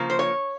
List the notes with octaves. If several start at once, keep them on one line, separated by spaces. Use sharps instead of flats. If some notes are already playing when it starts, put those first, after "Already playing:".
Already playing: C#3 F3 A#3
C5
C#5